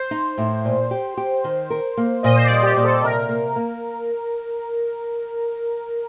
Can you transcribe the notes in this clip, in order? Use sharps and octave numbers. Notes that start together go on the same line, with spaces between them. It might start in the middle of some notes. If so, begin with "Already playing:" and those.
Already playing: C5
D#4
A2
A#2
G4
G4
D#3
A#4
A#3
A#2 D#5
C5
D5
G3
G4
A#2
A4
C3 A#4
A#3
A#3